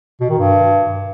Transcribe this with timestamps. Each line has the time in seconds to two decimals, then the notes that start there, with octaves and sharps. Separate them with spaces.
0.20 B2
0.29 D#3
0.38 G2